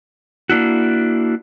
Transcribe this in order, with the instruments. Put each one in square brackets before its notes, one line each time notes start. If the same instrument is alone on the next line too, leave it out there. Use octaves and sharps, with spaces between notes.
[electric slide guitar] A#3 D4 E4 F#4